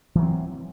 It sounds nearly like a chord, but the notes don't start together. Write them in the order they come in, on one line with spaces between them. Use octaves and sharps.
E3 F#3 C4